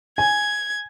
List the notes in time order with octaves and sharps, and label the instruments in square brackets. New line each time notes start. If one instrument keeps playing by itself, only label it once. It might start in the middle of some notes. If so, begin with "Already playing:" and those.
[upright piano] G#5 [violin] G#6